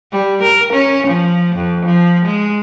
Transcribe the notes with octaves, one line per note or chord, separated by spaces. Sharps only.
G3
A#4
C#4
F3
F2
F3
G#3